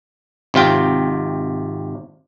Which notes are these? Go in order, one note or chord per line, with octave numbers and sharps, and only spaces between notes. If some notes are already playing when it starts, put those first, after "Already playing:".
G#1 C3 F4 G5